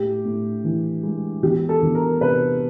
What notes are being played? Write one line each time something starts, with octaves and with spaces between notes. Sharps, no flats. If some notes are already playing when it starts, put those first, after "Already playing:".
Already playing: A2 G4
A2
E3
G#3
E2 G4
A4
E2
A#4
C3 B4